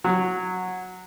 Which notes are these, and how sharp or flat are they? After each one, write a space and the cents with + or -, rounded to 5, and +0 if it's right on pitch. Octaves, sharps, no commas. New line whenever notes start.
F#3 -10